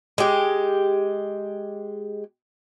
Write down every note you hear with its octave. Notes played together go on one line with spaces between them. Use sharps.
G#3 G4